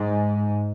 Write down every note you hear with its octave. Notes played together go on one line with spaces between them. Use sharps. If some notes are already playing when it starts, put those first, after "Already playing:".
Already playing: G#2